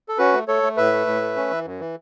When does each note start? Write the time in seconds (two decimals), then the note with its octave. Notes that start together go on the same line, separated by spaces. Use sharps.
0.09 A4
0.18 C#4 F#4 B4
0.33 A3
0.48 A3 A4 C#5
0.63 A3
0.77 A2 B4 E5
0.92 A3
1.07 A2
1.22 A3
1.36 C#4
1.50 E3
1.65 F#2
1.80 E3